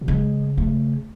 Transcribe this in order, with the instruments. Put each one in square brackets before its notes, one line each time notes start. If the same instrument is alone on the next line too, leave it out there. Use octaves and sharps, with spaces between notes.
[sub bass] B2
[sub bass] C#3 [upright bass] G#3
[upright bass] A3